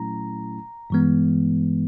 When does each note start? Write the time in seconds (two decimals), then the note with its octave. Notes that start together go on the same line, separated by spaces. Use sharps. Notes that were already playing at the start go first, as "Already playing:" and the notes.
Already playing: A#2 F#3 A3 C#4 E4 A#5
0.90 G2 E3 G#3 B3